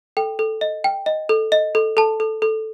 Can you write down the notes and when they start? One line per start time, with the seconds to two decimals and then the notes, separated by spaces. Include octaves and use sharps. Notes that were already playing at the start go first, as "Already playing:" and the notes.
0.17 A4 G5
0.39 A4
0.61 D#5
0.84 G5
1.06 D#5
1.29 A4
1.52 D#5
1.75 A4
1.97 A4 A5
2.20 A4
2.42 A4